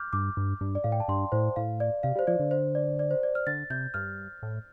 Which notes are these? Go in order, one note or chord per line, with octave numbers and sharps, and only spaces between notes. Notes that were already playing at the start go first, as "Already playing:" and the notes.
Already playing: D6 F6 G6
G2 D6
G2
G2
D5
A2 F5
G5
A5
G2 C6
A2 C5
A2 F5
D5
C3 F5
G3 C5
F3 D5
D3
C5
D5
D5
C5
D5
F6
D3 A6
C3 G6
G2 F6
A2